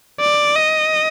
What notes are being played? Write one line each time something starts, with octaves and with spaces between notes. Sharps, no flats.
D5
D#5